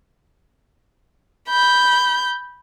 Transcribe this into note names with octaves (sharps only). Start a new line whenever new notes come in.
B5 G6